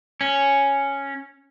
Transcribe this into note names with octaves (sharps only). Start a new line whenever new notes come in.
C#4